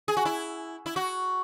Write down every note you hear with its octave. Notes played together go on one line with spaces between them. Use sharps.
G#4
F#4
E4
E4
F#4